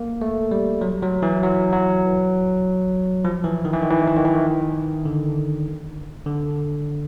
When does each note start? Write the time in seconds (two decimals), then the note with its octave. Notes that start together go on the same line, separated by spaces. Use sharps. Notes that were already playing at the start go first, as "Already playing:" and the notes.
Already playing: A#3
0.22 A3
0.51 G3
0.81 F#3
1.02 F#3
1.22 E3
1.43 F#3
1.73 F#3
3.25 F3
3.44 E3
3.65 D#3
3.73 E3
3.82 D#3
3.90 E3
3.99 D#3
4.08 E3
4.17 D#3
4.25 E3
4.35 D#3
5.05 D3
6.26 D3